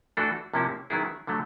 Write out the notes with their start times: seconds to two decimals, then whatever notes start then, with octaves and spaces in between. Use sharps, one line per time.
0.17 E3 A3 D4 F#4 A4
0.53 C3 F3 A#3 C#4 E4
0.90 D#3 F#3 B3 E4 G#4
1.27 D3 F#3 A3